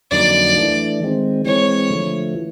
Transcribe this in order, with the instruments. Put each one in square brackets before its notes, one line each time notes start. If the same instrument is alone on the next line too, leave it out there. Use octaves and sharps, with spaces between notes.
[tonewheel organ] F2 D3 F#3 A#3 D#4 [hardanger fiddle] D5
[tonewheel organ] E3 A3 D4
D#3 G#3 C4
[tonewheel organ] E3 G#3 C4 [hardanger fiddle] C#5
[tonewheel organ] D3 F3 A3
E3